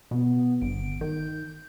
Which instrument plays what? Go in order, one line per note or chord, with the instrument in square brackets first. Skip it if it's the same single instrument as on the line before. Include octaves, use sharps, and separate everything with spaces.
[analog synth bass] B2 [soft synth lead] B3
[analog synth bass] G1 [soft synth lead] D7
[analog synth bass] D#3 [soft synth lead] G6